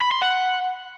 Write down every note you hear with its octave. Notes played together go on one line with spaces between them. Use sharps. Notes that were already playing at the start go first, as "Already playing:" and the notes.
B5
C6
F#5